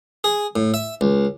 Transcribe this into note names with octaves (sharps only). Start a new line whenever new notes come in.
G#4
A2
E5
C#2